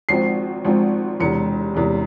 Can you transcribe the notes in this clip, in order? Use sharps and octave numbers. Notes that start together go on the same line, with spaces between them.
G#1 G#2 F3 C4 C7
G#1 G#2 F3 C4
E1 E2 C3 C#7
E1 E2 C3